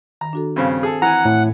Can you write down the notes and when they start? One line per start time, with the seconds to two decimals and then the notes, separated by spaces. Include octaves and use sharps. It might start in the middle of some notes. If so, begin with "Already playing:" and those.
0.21 D#3 A#5
0.33 D4 F#4 A4
0.56 G2 C#3 C4 C5 F5
0.83 G#4 A4
1.02 E3 F#5 G#5 A#5
1.25 A2